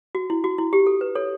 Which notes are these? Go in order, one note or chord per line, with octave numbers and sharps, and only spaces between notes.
F#4
E4
F#4
E4
G4
A4
B4
A4 C#5